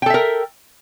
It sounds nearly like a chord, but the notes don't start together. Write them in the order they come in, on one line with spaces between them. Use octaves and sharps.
G5 A4 E5 A#4